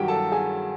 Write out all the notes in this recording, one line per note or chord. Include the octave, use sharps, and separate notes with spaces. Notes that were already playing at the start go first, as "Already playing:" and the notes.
Already playing: G2 D#3 F#3 F#4 G4 G5
A4 A5
G#4 G#5